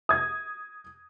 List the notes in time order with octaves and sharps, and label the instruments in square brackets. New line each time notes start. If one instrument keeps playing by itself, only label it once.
[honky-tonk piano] D#6 G#6